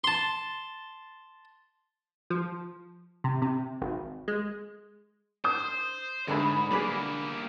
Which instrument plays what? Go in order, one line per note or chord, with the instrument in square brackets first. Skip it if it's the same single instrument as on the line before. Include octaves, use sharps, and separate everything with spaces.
[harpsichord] A5 C6
[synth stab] F3
C3
C3
G#1
G#3
[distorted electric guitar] C5 [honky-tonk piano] D#6 G6
[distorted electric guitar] G#2 [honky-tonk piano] D3 B5 [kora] G#3 A3 G#4
[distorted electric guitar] G3 A#3 [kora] G#4 B4 D5